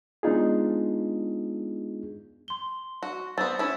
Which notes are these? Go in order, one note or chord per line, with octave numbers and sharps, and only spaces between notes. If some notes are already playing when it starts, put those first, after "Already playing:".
G#3 B3 D4 D#4 F4 G#4
C6 G7
F#4
B3 C4 A6
C#4 E4